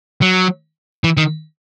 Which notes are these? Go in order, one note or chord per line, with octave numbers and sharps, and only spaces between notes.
F#3
E3
D#3